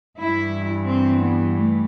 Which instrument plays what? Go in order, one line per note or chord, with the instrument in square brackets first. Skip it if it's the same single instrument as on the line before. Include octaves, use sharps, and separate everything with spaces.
[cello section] G2 E3 E4
C4
B3
A3